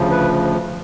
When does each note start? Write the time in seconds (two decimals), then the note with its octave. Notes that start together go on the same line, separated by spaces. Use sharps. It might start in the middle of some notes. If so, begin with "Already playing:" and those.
Already playing: D2 C#3 F3
0.11 B4